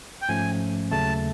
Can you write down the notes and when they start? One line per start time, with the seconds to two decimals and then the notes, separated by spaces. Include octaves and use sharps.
0.22 G5
0.29 G#2 F3 A3 C#4 G#5
0.91 D#2 C#3 F#3 A3 A5